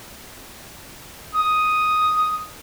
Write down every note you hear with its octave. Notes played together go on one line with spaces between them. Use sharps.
D#6